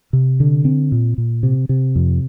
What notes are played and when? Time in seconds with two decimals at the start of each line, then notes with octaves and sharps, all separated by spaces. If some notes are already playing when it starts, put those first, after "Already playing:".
0.13 C3
0.40 D3
0.65 C4
0.92 A#2
1.18 A#2
1.43 C3
1.69 C3
1.96 F2